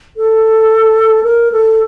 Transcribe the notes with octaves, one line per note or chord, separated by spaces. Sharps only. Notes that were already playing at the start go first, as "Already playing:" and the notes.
A4
A#4
A4